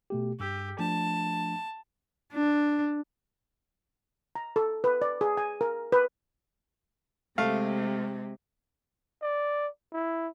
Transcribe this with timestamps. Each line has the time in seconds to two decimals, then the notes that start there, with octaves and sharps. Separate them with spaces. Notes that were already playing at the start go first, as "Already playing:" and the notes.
0.10 B2 A3 G4
0.40 G2 G4 E6
0.79 F3 A3 D4 A5
2.34 D4
4.35 A#5
4.56 A4
4.84 B4
5.02 D5
5.21 G#4
5.37 G#5
5.61 A#4
5.92 B4
7.38 C3 G#3 A3 F5
9.22 D5
9.93 E4